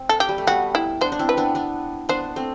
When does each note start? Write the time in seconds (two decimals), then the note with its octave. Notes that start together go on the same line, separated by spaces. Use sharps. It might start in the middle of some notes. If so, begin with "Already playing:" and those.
Already playing: C4
0.09 A4
0.20 G4
0.29 G3
0.38 A3
0.47 G3 B3 F#4
0.75 E4
1.01 B3 D4 C5
1.12 D4
1.19 C4 E4
1.29 B4
1.37 B3 D4
1.55 B3 D4
2.09 B3 D4 C5
2.36 A3 C4